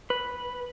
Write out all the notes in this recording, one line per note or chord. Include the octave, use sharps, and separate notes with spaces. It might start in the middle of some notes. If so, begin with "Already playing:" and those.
B4